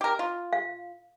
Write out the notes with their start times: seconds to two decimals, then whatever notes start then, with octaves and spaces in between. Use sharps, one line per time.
0.01 G4 A#4
0.19 F4
0.53 F5